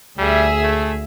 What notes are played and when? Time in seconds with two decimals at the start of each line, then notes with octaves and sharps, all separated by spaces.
0.19 D2 G3 G#4 E5
0.63 A3